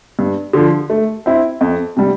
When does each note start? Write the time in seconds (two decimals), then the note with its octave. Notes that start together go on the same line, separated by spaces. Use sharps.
0.19 G2
0.53 D3 F3
0.90 A3
1.26 C4 E4
1.61 F2
1.97 C3 G3